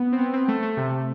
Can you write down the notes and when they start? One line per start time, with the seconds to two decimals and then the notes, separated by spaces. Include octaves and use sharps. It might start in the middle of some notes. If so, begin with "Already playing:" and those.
Already playing: B3
0.13 C4
0.19 B3
0.33 C4
0.48 A3
0.62 A3
0.77 C3